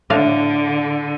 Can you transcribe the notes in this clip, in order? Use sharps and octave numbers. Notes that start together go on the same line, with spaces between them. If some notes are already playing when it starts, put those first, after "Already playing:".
A2 D3 D4 F5